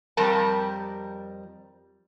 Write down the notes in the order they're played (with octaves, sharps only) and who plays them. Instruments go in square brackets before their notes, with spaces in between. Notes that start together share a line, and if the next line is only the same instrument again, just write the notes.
[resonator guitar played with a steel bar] F2 G3 G4 A#4 A5